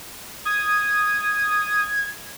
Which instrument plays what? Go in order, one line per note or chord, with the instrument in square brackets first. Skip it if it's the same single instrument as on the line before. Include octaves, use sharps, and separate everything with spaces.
[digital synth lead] D#6 [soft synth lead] G#6